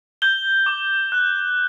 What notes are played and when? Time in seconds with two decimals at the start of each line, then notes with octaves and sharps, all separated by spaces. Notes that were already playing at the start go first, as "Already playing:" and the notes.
0.22 G6 G7
0.66 D6
1.12 F#6